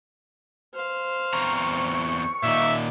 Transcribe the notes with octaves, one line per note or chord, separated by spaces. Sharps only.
C5 F5
E2 C4 A#5 C#6
A#2 D#3 D#4 E5 D6